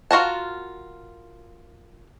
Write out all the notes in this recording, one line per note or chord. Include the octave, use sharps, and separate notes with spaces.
F4 F#4 A#4 A5